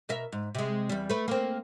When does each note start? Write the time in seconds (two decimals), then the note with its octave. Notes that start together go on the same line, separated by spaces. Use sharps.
0.09 B2 A#4 E5
0.32 G#2
0.55 C3 G#3
0.89 E2 G3
1.10 A3 B4
1.28 A#3 C4